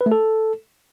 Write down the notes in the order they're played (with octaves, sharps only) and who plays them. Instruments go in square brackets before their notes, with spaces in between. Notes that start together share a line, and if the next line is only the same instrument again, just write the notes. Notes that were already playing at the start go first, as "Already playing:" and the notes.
[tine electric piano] B4
A3
A4